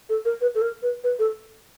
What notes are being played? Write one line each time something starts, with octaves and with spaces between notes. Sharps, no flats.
A4
A#4
B4
A4
A#4
B4
B4
A4